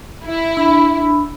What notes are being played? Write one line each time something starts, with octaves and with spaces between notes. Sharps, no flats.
E4
D4 B5 E6